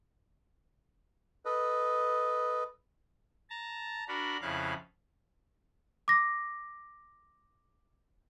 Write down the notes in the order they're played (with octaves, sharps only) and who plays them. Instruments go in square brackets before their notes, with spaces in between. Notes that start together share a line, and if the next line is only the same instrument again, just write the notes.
[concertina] A4 B4 D#5
[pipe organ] A5 A#5
D4 F#4 A#4 B5
F2 C#3 E4 F5 F#6
[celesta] D6 A#6